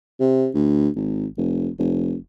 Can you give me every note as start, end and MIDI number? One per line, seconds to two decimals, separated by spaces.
0.20 0.49 48
0.54 0.88 38
0.96 1.26 32
1.38 1.69 29
1.78 2.16 29